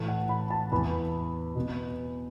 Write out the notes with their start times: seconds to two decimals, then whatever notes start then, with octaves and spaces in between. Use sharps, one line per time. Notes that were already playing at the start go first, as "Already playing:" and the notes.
Already playing: A2 E3 A3 A5
0.08 F#5
0.29 B5
0.50 A5
0.71 E2 E3 B3 B5
1.55 B2 B3